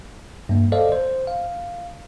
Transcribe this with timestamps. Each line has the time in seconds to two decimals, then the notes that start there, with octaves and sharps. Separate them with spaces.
0.49 G2 A#3
0.72 A4 C5 D5 D#5 F5
0.92 C5
1.27 F5